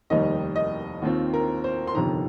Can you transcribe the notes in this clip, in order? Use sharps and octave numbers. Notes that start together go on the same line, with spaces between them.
F1 D#2 D#3 G3 D#4 D#5
D#5
D#2 D#3 C4 F4
A#4
C5
C6
G1 F2 C3 D#3 A#5